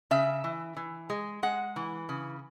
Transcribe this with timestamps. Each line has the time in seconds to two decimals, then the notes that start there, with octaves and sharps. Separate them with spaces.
0.11 C#3 E5
0.44 E3
0.77 E3
1.10 G#3
1.43 G#3 F#5
1.76 E3
2.09 C#3